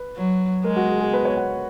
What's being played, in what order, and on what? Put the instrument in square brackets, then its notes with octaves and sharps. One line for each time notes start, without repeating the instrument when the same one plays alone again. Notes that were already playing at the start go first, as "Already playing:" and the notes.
Already playing: [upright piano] B4
[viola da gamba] F#3
[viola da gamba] G#3 [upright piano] A#4
[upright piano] F#4
G#4
G#4
B4
C#5
F#5